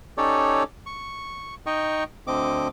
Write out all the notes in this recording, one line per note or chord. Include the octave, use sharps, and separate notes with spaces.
C#4 D#4 G4 A4 C#5 D5
C#6
D#4 D#5 G5 C#6
D2 D3 C4 D#5 D6